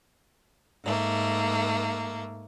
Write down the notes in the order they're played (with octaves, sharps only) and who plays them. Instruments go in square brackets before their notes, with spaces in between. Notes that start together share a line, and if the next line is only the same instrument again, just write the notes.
[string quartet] G#2 A3 A#3